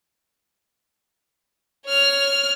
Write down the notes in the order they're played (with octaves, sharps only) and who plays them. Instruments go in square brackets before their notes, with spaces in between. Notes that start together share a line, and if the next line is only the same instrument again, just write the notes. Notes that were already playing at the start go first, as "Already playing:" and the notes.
[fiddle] C#5 F6